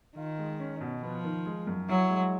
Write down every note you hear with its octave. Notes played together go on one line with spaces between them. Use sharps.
D#3 F4
G#3
C#4
B2
F3 B3
D#3
G#3
F#2
F#3 E4
G#3